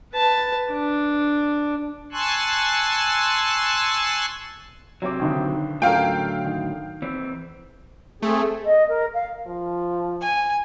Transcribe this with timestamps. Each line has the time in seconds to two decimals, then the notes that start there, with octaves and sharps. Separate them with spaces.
0.14 B4 A5
0.74 D4
2.12 G#5 A5 C6 C#6 E6 F#6
5.02 C3 F#3 C4 D6
5.20 B1 D3 D#3
5.82 A2 D3 F#3 C#4 A4 A#4 F5 G5
6.45 D#3
7.02 E3 C4
8.22 A3 C4 G#4
8.64 D#5
8.88 A#4
9.14 F5
9.47 F3
10.21 G#5